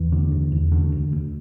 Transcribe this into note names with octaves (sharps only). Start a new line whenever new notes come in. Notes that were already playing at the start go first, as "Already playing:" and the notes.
Already playing: E2 E3
D3
E2
E2
D3
D2
D2